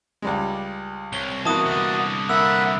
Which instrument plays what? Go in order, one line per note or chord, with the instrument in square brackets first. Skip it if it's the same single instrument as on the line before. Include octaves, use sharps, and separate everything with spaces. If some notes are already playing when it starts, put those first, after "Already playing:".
[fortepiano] C#2 G3 G#3
[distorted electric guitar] C2 [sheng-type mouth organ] C#5 [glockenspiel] G7
[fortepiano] E3 A#3 B3 [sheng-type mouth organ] F#4 D#5 [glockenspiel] A5 D#6
[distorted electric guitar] C2 D3
[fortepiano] A#3 [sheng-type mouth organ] E5 F#5 B5 [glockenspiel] E6